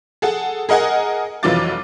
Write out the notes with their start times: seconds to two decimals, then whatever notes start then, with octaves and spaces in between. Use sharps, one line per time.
0.22 G#4 A4 F#5
0.69 G#4 A#4 D#5 F#5 G#5
1.43 F1 E3 F#3 F4 D6 A6